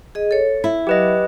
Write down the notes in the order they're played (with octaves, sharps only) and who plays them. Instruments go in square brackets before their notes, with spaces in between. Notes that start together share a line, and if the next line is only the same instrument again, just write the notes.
[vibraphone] G#4 D#5
A4 C#5
[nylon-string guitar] E4
[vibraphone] F#3 [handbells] G4 B4 D#5